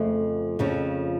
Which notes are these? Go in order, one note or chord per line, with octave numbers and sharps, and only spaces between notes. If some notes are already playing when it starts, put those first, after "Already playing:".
Already playing: F2 C#3 F3 A3
F2 C#3 F3